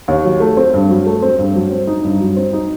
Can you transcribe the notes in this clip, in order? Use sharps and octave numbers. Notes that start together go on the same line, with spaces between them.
D#2
F#3
A3
C4
G2
F#3
A3
C4
G2
F#3
C4
D#4
G2
F#3
C4
D#4